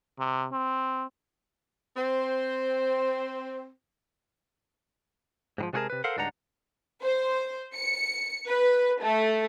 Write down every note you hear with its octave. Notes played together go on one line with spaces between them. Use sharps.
C3
C4
C4 C5
G#2 D#3 F3
C3 G#3 F#4 G#4 A#4 A5
C3 B4
A4 A#4 C5 F5 F#5
C#2 G2 D4 D#4 F#5 A#5
C5
C#7
B4
A3